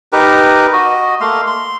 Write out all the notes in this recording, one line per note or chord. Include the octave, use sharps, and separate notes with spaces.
D#4 G4 A#4 B4
F#4 D#5
A3 A#3 F5 C6
C6